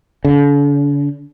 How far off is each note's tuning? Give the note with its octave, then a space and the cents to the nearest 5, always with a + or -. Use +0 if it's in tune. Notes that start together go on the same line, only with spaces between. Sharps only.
D3 -45